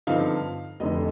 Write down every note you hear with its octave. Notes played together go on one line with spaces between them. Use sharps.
G2 D3 F3 C4 D#4 F5
F1 F2 D3 D#5